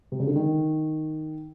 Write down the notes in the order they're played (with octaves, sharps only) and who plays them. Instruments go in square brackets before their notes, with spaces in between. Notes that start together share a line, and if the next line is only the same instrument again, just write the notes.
[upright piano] C3
C#3
D3
D#3